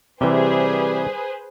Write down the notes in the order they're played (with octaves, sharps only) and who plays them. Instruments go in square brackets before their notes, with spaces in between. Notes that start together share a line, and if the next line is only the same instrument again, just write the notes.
[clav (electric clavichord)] C3 E3 [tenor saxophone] G3 [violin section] G#4 B4 C5